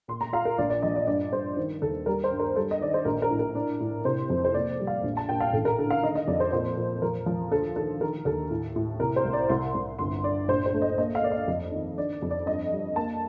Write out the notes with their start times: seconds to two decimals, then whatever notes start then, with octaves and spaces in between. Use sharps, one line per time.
0.08 A#2 C6
0.21 A#5
0.33 F4 F5
0.45 A#4
0.58 A#1 D5
0.70 D5
0.83 F3 D#5
0.96 D5
1.07 G2 D5
1.33 G2 C5
1.57 D#3
1.82 D#2 A4
2.06 G3 A#4
2.24 C5
2.32 G2
2.40 A#4
2.56 G3 A4
2.71 D#5
2.81 D#3 D5
2.94 C5
3.05 A#1 A#4
3.22 A#4
3.31 A2
3.39 A#4
3.55 D4
3.80 A2
4.05 C3 C5
4.30 F2
4.45 C5
4.54 A#3 D5
4.79 G3
4.87 F5
5.04 A#1
5.17 A5
5.29 A#2 G5
5.40 F5
5.53 A1 A4
5.65 A#4
5.78 D3 A4
5.91 F5
6.03 D#3 D#5
6.15 D#5
6.27 F2 D5
6.40 C5
6.52 A#2 C5
6.77 A#2
7.02 F3 A#4
7.26 F3
7.52 D2 A4
7.76 D#3 A4
8.01 D#3 A#4
8.25 D#2 A4
8.51 A2
8.76 A2
9.00 C3 A#4
9.16 C5
9.25 C2
9.33 D5
9.49 C2 C6
9.74 C2
9.99 G1 C6
10.24 D3 D5
10.48 A#1 C5
10.66 C5
10.74 A3
10.82 D#5
10.98 A#3 D#5
11.15 F5
11.23 A#3 D5
11.31 D#5
11.48 F2
11.72 D#3
11.98 D4 D5
12.22 F2
12.31 D5
12.46 G2 D#5
12.72 G3
12.96 A#3 A5